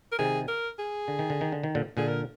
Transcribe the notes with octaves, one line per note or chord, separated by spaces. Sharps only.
A#4
C3 D#3 G#4
A#4
G#4
D3
D#3
D3
D#3
D3
D#3
A#2 D3
A#2 D3 G#4
A#4